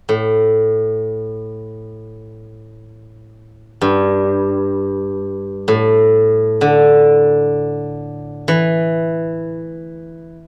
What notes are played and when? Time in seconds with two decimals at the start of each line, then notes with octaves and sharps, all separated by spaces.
0.09 A2
3.81 G2
5.68 A2
6.61 D3
8.48 E3